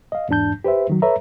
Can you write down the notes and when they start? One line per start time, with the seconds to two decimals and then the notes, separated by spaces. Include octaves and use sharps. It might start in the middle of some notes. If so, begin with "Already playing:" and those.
0.12 D#5 F5
0.29 E2 G#2 D4 A5 G6
0.64 G4 B4 C5 E5
0.90 D#3 F#3
1.02 A4 B4 C#5 E5 A#5